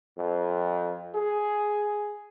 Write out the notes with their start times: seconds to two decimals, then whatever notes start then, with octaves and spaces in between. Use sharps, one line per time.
0.18 F2
1.15 G#4